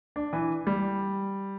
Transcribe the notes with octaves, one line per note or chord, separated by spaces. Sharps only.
D4
E3
G3